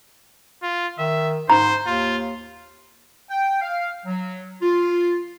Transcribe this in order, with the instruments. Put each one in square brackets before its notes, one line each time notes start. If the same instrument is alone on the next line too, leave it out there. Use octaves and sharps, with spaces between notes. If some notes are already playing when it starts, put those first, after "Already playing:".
[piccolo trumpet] F4
[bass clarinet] D#3 [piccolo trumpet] E5
[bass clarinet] G#2 [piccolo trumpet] C5 [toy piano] A#5
[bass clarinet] D#2 [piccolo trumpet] F4
[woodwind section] G5
F5
F#3
F4